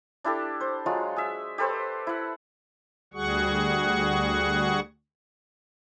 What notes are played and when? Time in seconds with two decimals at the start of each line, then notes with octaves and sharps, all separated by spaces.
0.24 D4 E4 G4 A4
0.61 C5
0.86 F#3 G#3 F4 F#4
1.16 G#4 E5
1.58 G4 A4 B4 C5
2.07 E4 F#5
3.14 D2 G3 F#4 G#4 F#5 C#6